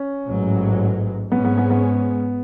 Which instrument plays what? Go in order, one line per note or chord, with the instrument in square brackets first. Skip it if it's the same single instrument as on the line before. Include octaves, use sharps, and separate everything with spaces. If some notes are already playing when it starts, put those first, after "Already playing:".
Already playing: [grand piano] C#4
[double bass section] A1 G#2 F#3
[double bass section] G#2 G#3 C#4 [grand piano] B3
[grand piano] B3
B3
B3